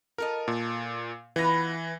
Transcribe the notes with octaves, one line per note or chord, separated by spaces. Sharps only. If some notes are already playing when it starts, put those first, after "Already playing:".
F4 A4 A#4 D#5
A#2
E3 B3 F4 B4 A#6